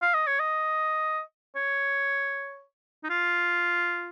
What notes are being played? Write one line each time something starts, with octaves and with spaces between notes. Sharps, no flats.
F5
D#5
C#5
D#5
C#5
D#4
F4